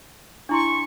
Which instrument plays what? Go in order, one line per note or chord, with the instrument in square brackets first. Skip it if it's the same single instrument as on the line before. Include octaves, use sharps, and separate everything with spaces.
[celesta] D4 E4 C6 [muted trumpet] C#6